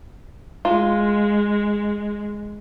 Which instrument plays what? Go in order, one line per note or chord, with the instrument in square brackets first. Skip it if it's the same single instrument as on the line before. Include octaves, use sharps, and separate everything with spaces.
[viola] G#3 [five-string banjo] F4